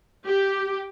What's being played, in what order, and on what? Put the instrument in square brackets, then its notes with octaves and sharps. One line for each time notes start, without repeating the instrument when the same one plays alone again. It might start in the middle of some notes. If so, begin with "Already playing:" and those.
[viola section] G4